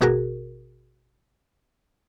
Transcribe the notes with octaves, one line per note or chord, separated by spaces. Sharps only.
G#1 B2 F#4 G#4 A#4